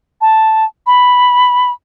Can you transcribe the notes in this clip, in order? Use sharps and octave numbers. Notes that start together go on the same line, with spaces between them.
A5
B5